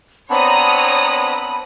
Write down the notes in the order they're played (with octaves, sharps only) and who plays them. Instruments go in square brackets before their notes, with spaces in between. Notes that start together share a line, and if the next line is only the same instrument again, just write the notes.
[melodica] B3 C4 D4 [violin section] C#5 A#5 D#6 [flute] B5